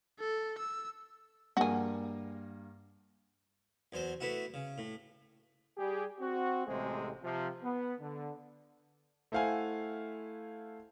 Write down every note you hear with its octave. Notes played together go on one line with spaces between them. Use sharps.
A4
E6
G2 A#3 F#4 G#4
E2 F#3 C5
A3 B3 E4 F#4
C#3
A2
G3 G4 G#4
C4 F#4
A1 C3 G#3 A3 G#4 C5
C3 F3
B3
D3
A3 E4 C5 F5 F#5 G#5